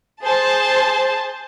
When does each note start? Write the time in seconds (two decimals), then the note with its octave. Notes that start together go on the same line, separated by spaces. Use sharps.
0.23 G#4 C5 A5